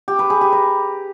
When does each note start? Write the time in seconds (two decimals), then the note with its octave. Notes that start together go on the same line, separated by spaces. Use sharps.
0.08 G4
0.19 B4
0.30 G#4
0.41 G4
0.52 A#5